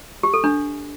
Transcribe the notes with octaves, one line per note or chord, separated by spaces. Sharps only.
G4
A4
D4